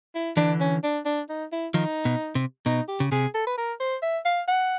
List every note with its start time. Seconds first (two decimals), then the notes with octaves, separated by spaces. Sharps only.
0.15 E4
0.37 D3 E3 D4
0.60 C#4
0.84 D4
1.05 D4
1.29 D#4
1.52 E4
1.74 D#3 F3 D#4
2.05 B2
2.35 C3
2.66 B2 D#4
2.88 G4
3.00 C#3
3.12 C3 G#4
3.34 A4
3.47 B4
3.58 A#4
3.80 C5
4.02 E5
4.25 F5
4.48 F#5